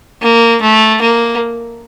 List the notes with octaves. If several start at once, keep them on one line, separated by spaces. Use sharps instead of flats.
A#3
A3
A#3